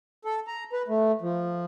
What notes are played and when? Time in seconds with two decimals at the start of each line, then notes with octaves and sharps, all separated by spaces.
0.25 A4
0.47 A#5
0.73 B4
0.88 A3
1.21 F3